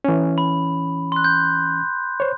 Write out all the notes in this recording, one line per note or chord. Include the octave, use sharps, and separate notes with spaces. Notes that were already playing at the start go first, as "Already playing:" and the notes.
E3 C#4
B5
C6 F#6
G6
C5 C#5